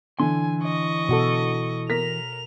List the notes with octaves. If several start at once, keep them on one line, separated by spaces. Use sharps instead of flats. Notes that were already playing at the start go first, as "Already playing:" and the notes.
D3 E3 E4 G#5 C6
D#5 C#6
B2 F#4 A4
A#4 A#6 B6 F7